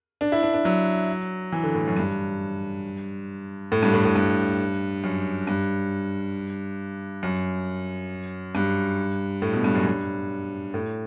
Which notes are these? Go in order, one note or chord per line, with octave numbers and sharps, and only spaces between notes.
D4
E4
D4
D4
F#3
E3
D3
A2
F#2
G2
A2
G2
A2
A2
G2
F#2
G2
F#2
G2
A2
B2
G2
F#2
G2
A2